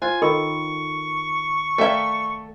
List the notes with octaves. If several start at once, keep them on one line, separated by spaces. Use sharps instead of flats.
F4 C5 G#5
D#3 A4 A#4 B5 C#6
A3 A4 A#4 D5 E5 F5 G5